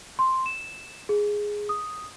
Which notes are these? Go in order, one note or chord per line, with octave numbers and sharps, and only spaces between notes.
C6
E7
G#4
D#6